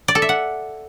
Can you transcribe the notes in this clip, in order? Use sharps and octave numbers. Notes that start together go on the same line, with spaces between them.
D5
A4
E5
F#5